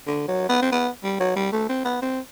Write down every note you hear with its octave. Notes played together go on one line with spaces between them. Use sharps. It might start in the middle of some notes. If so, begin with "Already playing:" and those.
D3
F#3
B3
C4
B3
G3
F#3
G3
A3
C4
B3
C4